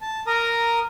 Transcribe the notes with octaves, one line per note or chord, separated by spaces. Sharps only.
A5
A#4 A#5 D#6